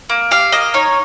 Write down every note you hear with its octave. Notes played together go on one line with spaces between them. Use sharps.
A#3
G4 F5
A#3 D#5
D#4 C#5